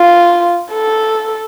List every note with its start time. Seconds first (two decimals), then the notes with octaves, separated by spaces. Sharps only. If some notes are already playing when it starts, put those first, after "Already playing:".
Already playing: F4
0.72 A4